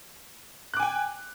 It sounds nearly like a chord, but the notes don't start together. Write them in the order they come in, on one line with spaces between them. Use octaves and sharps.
F#6 D6 G#5 G5